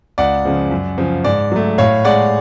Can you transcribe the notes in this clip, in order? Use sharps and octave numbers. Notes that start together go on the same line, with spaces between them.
C#2 D5 F#5
C#3 F3 G#3
F#2
C#3 F3
G#2 D5
F#3 A3
A2 C#5 F5
G#3 D5 F#5